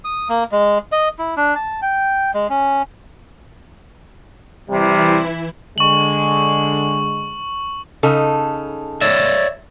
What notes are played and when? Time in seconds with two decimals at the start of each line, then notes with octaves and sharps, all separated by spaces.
0.05 D#6
0.29 A#3
0.52 G#3
0.92 D#5
1.19 E4
1.37 D4
1.55 A5
1.82 G5
2.34 G#3
2.50 C#4
4.69 C3 E3 G3 E4
5.78 D3 G#3 C#6 F#7
8.03 C#3 D#4 A4
9.01 C#5 D5 E5